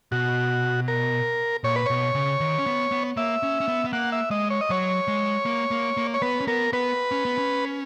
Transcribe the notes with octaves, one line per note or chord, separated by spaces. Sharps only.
B2 F#4
A#4
A#2 C#5
B4
B2 C#5
C#3
D#3
C#4
B3
B3
A#3 E5
C#4
C#4
B3
B3
A#3 F#5
E5
G#3 D#5
C#5
D#5
F#3 C#5
G#3
A#3
A#3
A#3
C#5
B3 B4
C#4
B3 A#4
B3 B4
C#4
B3
C#4